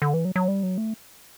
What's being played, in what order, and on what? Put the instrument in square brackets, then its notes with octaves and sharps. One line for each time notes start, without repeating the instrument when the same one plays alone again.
[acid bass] D3
E3
F#3
F#3
G3
F#3
A3